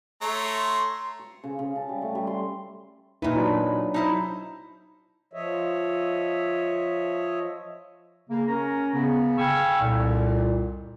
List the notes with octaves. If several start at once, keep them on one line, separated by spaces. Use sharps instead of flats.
A3 C#5 A#5 C6
C#6
C#3
C#3
A5
G3
A3
G3
C6
A#2 D#4 E4 B4
F#3 D4
D#4 E4 C5
F3 C#5 D#5 E5
C#3 A#3
C#4 A#4 A#5
C#3 B3
F5 G5 G#5 B5 C#6 E6
C2 F2 A#2